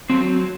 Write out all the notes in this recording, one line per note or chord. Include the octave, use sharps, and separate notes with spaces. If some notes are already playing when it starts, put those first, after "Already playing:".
F#3 C4